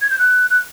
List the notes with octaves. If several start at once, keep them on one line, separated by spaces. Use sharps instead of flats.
G#6
G6
F#6
F#6